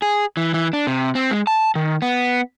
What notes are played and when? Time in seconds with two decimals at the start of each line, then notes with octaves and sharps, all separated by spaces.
0.02 G#4
0.37 E3
0.54 E3
0.73 D4
0.87 C3
1.15 C4
1.31 G#3
1.47 A5
1.75 D#3
2.02 B3